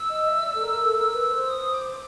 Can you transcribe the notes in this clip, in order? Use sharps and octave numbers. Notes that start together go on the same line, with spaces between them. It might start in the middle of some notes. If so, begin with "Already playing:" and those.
Already playing: E6
D#5
E5
D5
A4
A#4
A4
A#4 E6
B4
C5
D#6
D6